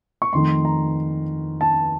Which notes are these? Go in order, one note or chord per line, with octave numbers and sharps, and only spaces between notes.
C#6
F2 D#3 A3 C6
A#5
A5